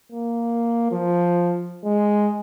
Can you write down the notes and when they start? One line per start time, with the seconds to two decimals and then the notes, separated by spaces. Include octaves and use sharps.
0.12 A#3
0.91 F3
1.84 G#3